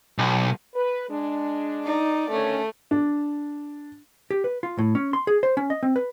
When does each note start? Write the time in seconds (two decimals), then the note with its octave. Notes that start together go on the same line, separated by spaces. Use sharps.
0.18 B1
0.75 B4
1.09 G#3 D4
1.85 D#4 D5
2.31 D3 D#3 A3 C#4
2.91 D4
4.31 G4
4.44 B4
4.63 F4
4.79 A2
4.95 C#4
5.13 C6
5.27 G#4
5.43 C5
5.57 C#4
5.70 D#5
5.83 C4
5.96 B4